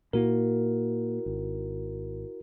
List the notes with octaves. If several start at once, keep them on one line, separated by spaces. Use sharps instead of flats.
A#2 A#3 E4 F#4 A#4
G#1